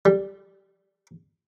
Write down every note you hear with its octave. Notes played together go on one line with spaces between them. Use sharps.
G3